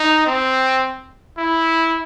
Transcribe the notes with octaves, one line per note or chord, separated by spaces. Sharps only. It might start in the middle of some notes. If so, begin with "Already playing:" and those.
Already playing: D#4
C4
E4